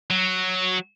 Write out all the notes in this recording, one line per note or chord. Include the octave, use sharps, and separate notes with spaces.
F#3